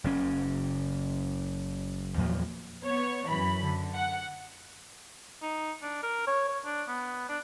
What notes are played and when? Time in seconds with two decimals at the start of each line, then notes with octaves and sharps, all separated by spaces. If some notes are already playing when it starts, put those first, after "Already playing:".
0.04 F#1 C#3 C#4
2.18 E2 A#2 F3 F#3
2.84 B3 C#5
3.29 F#2 E3 B5
3.63 D3
3.95 F#5
5.42 D#4
5.82 D4
6.03 A#4
6.27 C#5
6.48 C#5
6.65 D4
6.88 B3
7.29 D4